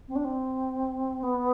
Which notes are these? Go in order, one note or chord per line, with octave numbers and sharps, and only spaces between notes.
C4
D4
C4
B3